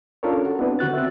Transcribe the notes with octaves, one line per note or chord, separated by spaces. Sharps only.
C#4 D4 F4 A4 A#4 C#5
F#4
B3 C4 D4 E4 B4
D3 F#4 F#6 A6
C4 E5